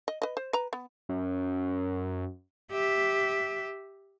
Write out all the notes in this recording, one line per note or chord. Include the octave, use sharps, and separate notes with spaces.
D#5
B4 D#5
C5
B4 A#5
B3
F#2
G4 E5